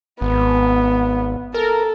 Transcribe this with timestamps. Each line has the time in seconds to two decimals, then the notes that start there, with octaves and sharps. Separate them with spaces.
0.21 G#1 B3
1.54 A4 A#4